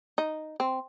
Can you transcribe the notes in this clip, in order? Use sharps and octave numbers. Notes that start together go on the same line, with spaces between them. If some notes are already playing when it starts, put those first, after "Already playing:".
D#4
C4